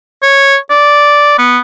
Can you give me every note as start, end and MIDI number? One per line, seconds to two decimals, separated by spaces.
0.22 0.56 73
0.70 1.36 74
1.39 1.59 59